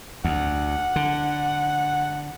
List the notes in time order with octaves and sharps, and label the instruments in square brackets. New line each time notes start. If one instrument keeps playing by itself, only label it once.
[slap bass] D2 [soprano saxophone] F#5
[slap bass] D3